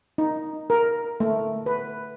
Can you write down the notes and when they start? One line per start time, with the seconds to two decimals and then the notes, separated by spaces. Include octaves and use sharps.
0.18 D#4
0.70 A#4
1.20 A3
1.66 B4